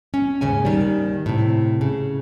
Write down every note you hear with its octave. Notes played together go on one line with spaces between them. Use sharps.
C#4
D#2 G#2 C#3 C#4 G#5
D#2 D#3 G3
A2 C3
C#3